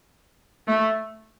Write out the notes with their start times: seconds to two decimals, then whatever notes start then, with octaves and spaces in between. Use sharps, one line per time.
0.67 A3